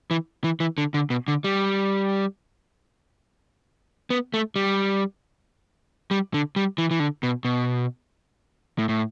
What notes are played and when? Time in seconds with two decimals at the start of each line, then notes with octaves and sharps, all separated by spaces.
0.11 E3
0.44 E3
0.60 E3
0.78 D3
0.94 D3
1.10 B2
1.28 D3
1.44 G3
4.10 B3
4.34 A3
4.56 G3
6.11 G3
6.34 D3
6.56 G3
6.78 E3
6.91 E3
7.00 D3
7.23 B2
7.45 B2
8.78 A2
8.89 A2